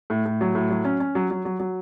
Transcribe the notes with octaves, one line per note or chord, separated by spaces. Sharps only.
A2
A2
F#3
A2
F#3
C#4
C#4
F#3
F#3
F#3
F#3